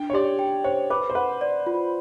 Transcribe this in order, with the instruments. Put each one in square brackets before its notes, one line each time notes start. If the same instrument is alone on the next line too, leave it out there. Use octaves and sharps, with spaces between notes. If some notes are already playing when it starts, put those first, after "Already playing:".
Already playing: [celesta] D4 [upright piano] G5
[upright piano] C#5
[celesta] G4 [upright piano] D5
[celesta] G5
[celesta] C5 [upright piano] C#5
[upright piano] B4 [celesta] D6
[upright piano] C5
[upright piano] B4 [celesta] F#5
[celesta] D5
F4